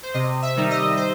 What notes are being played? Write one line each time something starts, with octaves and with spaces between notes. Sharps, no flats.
C5
C3 D#5
E5
D#3 G3 D#4
D#5
C5